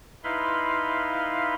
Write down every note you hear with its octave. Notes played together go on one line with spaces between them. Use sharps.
D#4 E4 B4 F5 B5 C6